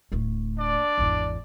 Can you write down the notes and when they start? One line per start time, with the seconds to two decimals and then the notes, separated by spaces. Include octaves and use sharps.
0.12 D1 A3
0.58 D4 D5
0.98 G#1 E2